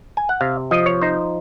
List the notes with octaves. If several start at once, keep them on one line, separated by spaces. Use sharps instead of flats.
G#5
F#5
C3 F5
F3 D#5
C#5
D#4 C5